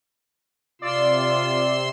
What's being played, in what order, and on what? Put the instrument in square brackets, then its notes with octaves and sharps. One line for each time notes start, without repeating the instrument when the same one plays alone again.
[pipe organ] C3 C6 E6 [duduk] F4 [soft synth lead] D5